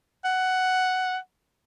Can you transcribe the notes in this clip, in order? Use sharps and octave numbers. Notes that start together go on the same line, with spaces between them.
F#5